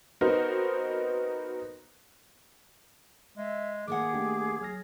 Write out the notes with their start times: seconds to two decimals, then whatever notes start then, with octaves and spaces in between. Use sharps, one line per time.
0.21 B3 C4 D#4 F#4 A#4 C5
3.38 G#3 E5
3.88 D#3 A#3 G#4 F#5 D6
4.13 A3 D4 G4
4.61 F#3 F6 A#6